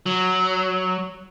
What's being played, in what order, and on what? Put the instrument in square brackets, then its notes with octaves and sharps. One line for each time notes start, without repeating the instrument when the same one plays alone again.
[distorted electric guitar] F#3